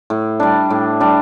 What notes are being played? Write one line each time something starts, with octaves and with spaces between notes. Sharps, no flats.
A2
G3 D4
A2
G3 D4